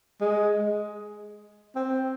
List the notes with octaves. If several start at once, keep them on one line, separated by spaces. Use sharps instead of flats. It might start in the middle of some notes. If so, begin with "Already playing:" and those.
G#3
C4